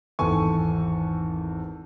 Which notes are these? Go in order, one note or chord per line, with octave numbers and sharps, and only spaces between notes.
G#1 E2 A4 G#5 C#6